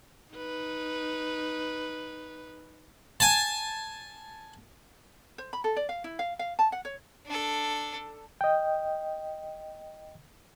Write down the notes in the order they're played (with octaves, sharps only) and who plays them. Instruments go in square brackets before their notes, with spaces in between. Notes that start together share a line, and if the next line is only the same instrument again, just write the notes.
[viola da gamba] D#4 B4
[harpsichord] G#5 A5
[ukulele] C5
B5
A4
D5
F5
E4
F5
F5
A5
F#5
C#5
[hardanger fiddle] D4 A4
[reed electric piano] D#5 G5